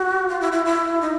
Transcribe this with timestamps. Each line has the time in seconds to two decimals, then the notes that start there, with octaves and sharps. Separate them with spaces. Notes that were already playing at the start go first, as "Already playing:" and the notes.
Already playing: F#4
0.29 F4
0.41 E4
0.52 E4
0.65 E4
1.01 D#4